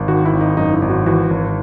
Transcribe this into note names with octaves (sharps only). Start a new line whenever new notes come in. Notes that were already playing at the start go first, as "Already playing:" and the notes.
Already playing: G#1
D#3 F#4
E4
G#1
D#4
F#2 D#4
E4
G#1
F#4
E3 F#4
G#1